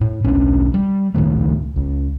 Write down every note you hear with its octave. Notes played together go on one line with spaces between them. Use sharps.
A2
B1 C#4 D4
G3
C#2 A2 D#3 A3
C#2